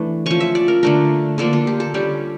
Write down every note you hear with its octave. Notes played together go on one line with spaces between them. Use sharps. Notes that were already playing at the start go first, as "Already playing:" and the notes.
Already playing: E3 A3 D4
F3 C#4 C#6
E5
D5
A#4
D3 A3 D4 A#4
D3 F3 A#3 D4 A4
F4
G4
A4
D3 G3 C#4 G4